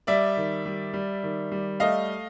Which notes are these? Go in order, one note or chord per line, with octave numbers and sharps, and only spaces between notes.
G3 D5 E5
D#3
G3
G3
D#3
G3
A3 D#5 F5